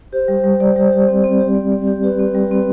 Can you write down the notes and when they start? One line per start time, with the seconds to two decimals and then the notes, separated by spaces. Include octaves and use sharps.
0.13 G4 C5
0.28 G3
0.44 G3
0.60 D5
0.76 G3
0.92 G4
1.08 C4
1.24 C4
1.40 G4
1.55 D5
1.72 D5
1.87 G4
2.03 G4 B4
2.19 C4
2.35 G3
2.51 C4